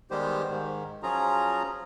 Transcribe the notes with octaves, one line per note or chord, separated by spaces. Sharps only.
D#3 G3 G#3 B3 G4 C5
G#2 D#3
F3 F#3 C#4 F4 G#4 A#5